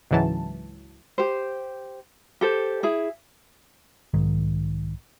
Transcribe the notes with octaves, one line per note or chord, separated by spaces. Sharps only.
C#2 G#2 E3 F#3 A5
G4 C5
G4 A4 C5
E4 G#4
B1 G#2 D#3